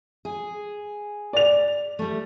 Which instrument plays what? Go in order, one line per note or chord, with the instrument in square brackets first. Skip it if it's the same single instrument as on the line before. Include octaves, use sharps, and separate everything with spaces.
[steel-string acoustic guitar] G#4
[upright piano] D5 F7
[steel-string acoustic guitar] G3 A3